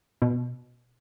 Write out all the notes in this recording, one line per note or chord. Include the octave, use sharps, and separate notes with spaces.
B2